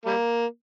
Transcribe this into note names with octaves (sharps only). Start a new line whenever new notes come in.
G3 A#3